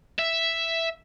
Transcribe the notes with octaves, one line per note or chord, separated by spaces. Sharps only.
E5